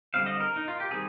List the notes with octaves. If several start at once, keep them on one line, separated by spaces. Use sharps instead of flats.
D3 G3 C4 F5
D#5
A#4
D#4
F4
G4
D#3 G3 C4 G#4